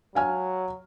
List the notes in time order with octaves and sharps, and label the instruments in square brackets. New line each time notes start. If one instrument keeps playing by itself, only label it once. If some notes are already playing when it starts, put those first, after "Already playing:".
[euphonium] F#3 [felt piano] F5 G#5 F6